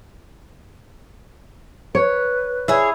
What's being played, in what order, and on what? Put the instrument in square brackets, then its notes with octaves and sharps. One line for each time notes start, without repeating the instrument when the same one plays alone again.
[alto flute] B4 [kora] C#5
[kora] E4 [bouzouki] G#4 C#5